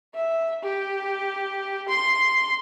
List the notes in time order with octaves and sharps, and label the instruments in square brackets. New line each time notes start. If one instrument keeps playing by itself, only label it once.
[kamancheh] E5
G4
C6